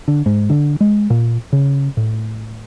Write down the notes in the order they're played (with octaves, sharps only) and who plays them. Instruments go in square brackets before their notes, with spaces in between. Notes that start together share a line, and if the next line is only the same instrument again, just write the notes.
[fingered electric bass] D3
G#2
D3
G#3
A#2
C#3
A2